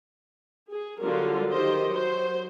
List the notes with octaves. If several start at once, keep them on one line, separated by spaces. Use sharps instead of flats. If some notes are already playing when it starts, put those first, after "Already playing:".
G#4
D3 F#3 G3 F4 A#4
D#3 G4 C5 D#5
F#3 C5